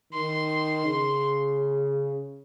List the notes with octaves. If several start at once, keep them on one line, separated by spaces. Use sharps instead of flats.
D#3 C6
C#3